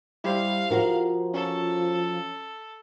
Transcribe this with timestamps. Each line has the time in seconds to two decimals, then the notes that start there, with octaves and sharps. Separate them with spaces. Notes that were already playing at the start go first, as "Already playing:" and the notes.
0.24 G3 E4 G4 C5 F5
0.70 F3 F#4 A#4
1.34 C#4 A4